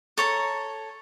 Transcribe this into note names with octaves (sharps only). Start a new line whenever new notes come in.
A4 C#5 A#5